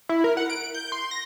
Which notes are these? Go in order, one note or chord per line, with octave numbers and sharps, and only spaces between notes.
E4
A#4
F#5
D7
G6
C6
A#6